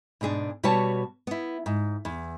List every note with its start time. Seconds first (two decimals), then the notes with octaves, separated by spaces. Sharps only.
0.21 G#2 B2 D4 G#4
0.63 B2 G3 F#4 B4 C#5 A5
1.27 B3 E4
1.66 G#2
2.05 E2